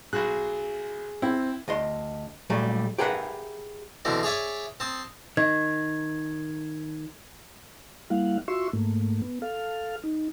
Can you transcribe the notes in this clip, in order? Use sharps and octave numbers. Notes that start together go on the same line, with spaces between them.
B1 F#4 G#4 F#6
C4 E4
D2 D#5 C6
A#2 F#3 G3 A3
G4 G#4 A#4 B4 E5 F#5
B2 D3 E3 C4
G#4 C#5 D5 E5 G#5
C4 A5 D#6
D#3 G#6
G3 A#3 E4 F5 F#5
F4 F#4 E5 C6 C#6 E6
G#2 A3 A#3
B3
A4 F5 F6
D#4